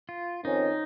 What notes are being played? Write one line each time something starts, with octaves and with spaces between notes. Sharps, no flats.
F4
F2 D#3 C#4 D#4